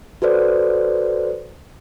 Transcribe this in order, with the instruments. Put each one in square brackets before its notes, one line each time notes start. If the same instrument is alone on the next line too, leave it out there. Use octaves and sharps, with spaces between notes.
[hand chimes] F#4 A4 B4 C5 D5